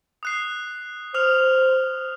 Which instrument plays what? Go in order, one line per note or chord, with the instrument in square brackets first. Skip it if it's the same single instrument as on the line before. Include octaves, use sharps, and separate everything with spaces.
[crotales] D#6 F#6 C7
[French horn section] C5 [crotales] D#6 F6 F7